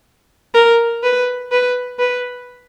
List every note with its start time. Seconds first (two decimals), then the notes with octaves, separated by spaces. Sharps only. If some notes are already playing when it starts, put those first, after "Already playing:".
0.54 A#4
1.03 B4
1.51 B4
1.99 B4